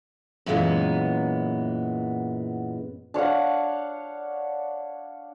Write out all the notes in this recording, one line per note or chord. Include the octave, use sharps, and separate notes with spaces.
F#2 A#2 E3 G#3 B3
D4 C#5 F5 F#5